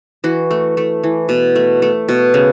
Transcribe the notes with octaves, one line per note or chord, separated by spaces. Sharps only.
E3 F#4
A3
A3
E3
B2
A3
A3
B2
C#3